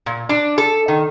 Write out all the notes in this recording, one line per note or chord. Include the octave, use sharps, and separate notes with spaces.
A#2
D4
A4
D#3